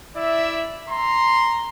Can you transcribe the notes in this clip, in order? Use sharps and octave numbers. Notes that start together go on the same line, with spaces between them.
E4 D5 E5
A#5 C6